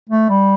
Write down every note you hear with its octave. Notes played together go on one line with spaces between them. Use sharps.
A3
G3